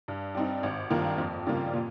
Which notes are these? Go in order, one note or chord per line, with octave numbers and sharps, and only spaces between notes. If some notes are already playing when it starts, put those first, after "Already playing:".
G2
G3 C4 D#4
G#1
G2 D#3 A#3 F4
F2
C#3 G3 A#3 F4
A#2